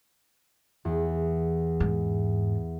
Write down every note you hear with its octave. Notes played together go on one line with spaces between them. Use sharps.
E2
G#2